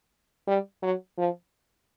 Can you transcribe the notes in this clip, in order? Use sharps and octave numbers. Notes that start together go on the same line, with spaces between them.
G3
F#3
F3